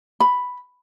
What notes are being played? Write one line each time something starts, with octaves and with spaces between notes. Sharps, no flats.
B5